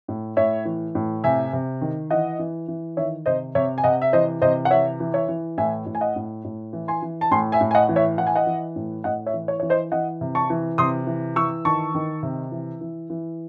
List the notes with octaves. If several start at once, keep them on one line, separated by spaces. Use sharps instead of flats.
A2
A2 C#5 E5
E3
A2
C3 E5 G#5
C3
D#3
E3 D#5 F#5
E3
E3
D#3 C#5 E5
C3 C5 D#5
C3 C#5 E5
G#5
C3 D#5 F#5
E5
E3 C5 D#5
C3 C5 D#5
F#5
E3 C#5 E5
E3
C#5 E5
E3
A2 E5 G#5
A2
G#5
D#5 F#5
A2
A2
E3
G#5 C6
E3
A5
A2 G#5 C6
E5 G#5
A2
G#5
D#5 F#5
E3
C#5 E5
E3 F#5
G#5
D#5 F#5
E3
A2
A2 D#5 F#5
C#5 E5
E3
C#5
E3 C#5
C5 D#5
E3 D#5 F#5
C3
A5 C#6
E3
C3 C6 D#6
E3
E3 C#6 E6
D#3 A5 C#6
D#3
C3
E3
E3
E3